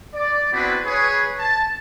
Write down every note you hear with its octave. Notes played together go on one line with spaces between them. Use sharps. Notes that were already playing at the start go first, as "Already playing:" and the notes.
D5
B3 C4 D4 E4 F#4 B4
G#4 B4 C#5
A5